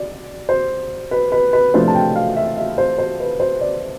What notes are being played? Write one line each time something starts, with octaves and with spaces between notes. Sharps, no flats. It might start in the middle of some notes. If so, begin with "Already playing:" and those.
Already playing: D5
C5
B4
B4
B4
C3 F3 A3 D4 F4 C5
A5
G5
F5
E5
E5
C5
C5
B4
C5
D5